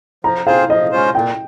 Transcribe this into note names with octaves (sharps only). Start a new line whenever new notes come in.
F3 A#5
C4 F4 G#4 C5 F5
F3 D#5
G#3 C#4 F4 C5
A#2 G5